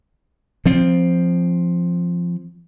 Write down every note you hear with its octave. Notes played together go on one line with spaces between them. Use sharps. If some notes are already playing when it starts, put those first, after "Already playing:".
F3 C4